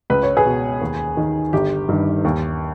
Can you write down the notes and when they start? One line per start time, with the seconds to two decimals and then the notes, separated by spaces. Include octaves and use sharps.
0.10 C#2 B4
0.23 C#5
0.37 G#4 B4
0.46 B2
0.82 D#2
1.17 D#3
1.53 G1 G4
1.89 G2 D#3
2.25 D#2